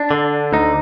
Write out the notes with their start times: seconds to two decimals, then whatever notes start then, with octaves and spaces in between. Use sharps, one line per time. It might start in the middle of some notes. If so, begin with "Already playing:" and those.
Already playing: D4
0.11 D3
0.53 D2 D#4